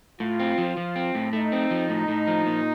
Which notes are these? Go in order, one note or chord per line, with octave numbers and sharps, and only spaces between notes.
A2 F4
C4
F3
F3
C4
A2
A3 D#4
C4
F3
A2
A2
F3
A#2